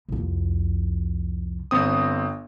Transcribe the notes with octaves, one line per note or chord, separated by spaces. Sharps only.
C2 F2
G1 C4 D#6